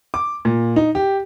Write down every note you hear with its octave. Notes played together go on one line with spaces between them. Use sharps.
D6
A#2
D#4
G4